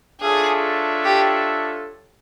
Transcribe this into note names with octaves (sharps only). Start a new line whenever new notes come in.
D4 F4 G#4 A4 C#5 E5
G4